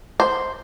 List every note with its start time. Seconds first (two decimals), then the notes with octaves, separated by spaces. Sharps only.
0.20 C5